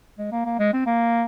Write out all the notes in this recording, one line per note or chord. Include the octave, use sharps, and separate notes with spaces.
G#3
A#3
A#3
G#3
C4
A#3